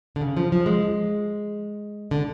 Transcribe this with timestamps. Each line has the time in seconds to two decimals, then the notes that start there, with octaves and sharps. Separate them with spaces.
0.16 D3
0.21 C#3
0.37 F3
0.52 F3
0.66 G#3
2.11 D3